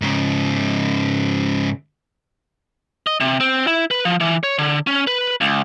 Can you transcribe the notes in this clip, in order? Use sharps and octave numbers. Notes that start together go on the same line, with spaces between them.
G#2 C#3
D#5
C3
C4
E4
B4
F3
E3
C#5
D3
C#4
B4
C#2